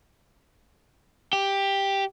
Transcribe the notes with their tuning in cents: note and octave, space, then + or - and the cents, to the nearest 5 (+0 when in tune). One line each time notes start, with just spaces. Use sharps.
G4 +5